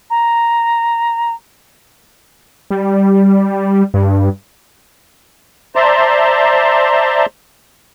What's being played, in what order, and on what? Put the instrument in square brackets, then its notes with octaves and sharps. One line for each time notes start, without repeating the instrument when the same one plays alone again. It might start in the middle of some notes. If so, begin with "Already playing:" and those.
[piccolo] A#5
[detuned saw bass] G3
G2
[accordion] C5 D5 E5 A5 A#5 C6